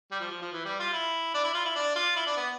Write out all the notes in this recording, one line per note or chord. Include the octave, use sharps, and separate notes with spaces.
G3
F3
F3
F3
E3
G3
F4
E4
D4
E4
F4
E4
D4
F4
E4
D4
B3